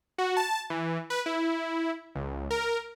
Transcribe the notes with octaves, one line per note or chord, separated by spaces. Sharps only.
F#4
A5
E3
B4
E4
C#2
A#4